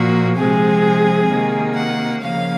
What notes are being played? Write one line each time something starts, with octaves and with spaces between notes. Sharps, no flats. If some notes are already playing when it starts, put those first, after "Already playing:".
Already playing: A#2 F3 A#3 F#4
C3 F3 G#3 C4 G#4
C3 D#3 A#3
F#5
C#3 F3 A#3 F5